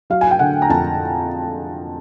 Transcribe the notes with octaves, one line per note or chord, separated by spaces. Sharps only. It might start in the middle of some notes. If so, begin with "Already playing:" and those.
F#3 F5
G#5
G5
D3 F#5
A#5
F2 A5